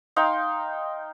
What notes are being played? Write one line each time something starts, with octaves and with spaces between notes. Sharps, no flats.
D#4 F5 G5 C6